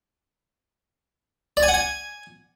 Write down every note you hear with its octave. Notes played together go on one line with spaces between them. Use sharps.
D5
G#5
F#5
G#5